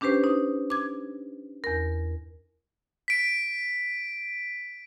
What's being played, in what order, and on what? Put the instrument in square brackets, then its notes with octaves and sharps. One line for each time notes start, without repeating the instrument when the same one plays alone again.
[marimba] C#4 D4 G4 B4 C5
D#4
D6 G#6
E2 A#4
[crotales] B6 D7